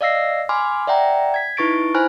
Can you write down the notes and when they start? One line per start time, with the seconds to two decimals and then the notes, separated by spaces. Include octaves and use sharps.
0.01 D5 D#5 F5 E6 A#6 C7
0.49 G#5 B5 C6 D6 F6
0.87 D5 E5 F#5 G5 A#5
1.34 G#6 B6
1.57 D#4 E4 B4 C#6 A6 D7
1.95 E4 C5 G#5 B5 F6 F#6